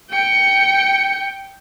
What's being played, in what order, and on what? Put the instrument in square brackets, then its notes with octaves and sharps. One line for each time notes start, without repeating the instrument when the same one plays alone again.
[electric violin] G5 C#7